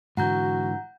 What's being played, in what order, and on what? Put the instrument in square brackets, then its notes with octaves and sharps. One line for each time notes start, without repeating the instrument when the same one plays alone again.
[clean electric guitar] G#2 D3 E3 [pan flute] F#4 [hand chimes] F#5 A#5 G6